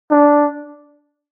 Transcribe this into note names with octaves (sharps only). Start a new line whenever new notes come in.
D4